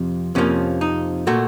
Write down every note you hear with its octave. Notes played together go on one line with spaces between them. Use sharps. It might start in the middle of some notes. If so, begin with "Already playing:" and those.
Already playing: F2 C3 F3
F2 C3 F3 A#3 C#4
D#4
A#2 A3 F#4